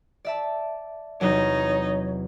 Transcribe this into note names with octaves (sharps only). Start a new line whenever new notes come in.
D5 E5 A5
E2 C3 F#3 D#4 C#5